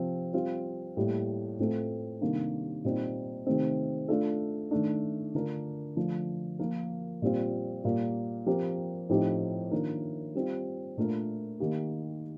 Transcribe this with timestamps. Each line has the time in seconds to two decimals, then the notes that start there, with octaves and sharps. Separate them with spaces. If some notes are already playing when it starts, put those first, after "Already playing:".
Already playing: C3 F3 C4
0.34 G3 C4 F4
0.97 A2 G3 A#3
1.59 A2 A3 C4 F4 A4
2.21 C3 D#3 G3 A#3 D4
2.85 A#2 G3 C4 D#4
3.47 C3 D#3 A3 C4
4.08 A3 D4 F4 A4
4.71 D#3 A3 D4
5.35 D3 A3 D4 F4 A#4
5.97 D3 F3 A3
6.59 F3 A#3 F4 A#4
7.22 A#2 G3 C4 F4
7.84 A#2 G3 A#3
8.46 F3 C4 G4 A#4
9.09 A2 F3 C4 D#4 G4
9.71 D#3 A#3 D4 F4 A#4
10.35 G3 C4 F4
10.97 A#2 A3 D4 F4 A#4
11.60 D#3 A#3 D#4 G4